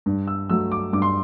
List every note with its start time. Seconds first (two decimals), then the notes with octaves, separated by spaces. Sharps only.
0.06 G2
0.27 E6
0.49 F#3 A3 E6
0.72 D6
0.93 G2 D6
1.02 C6